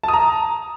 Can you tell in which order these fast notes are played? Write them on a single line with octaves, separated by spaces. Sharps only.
A5 D#6 A#5